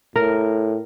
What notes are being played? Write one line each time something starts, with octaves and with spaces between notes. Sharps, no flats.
A2 A#4